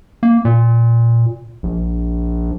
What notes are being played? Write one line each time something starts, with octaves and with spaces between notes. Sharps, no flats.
A#3
A#2
A#1